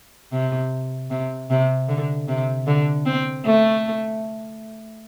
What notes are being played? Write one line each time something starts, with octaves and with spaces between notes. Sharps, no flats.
C3
C3
C3
D3
C3
D3
C4
A3